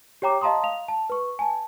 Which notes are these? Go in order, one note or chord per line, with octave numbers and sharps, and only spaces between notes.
G4 C#5 G5 A#5 D6
D#5 F5 A5 A#5 C6 D#6
F5 F7
A5
B4 C#6
G#5 A5